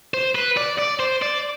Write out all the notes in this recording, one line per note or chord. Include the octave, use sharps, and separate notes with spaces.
C5
B4
D5
D5
C5
D5